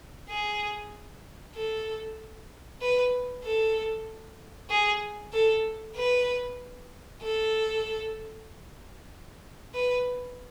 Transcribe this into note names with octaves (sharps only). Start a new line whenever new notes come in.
G#4
A4
B4
A4
G#4
A4
B4
A4
B4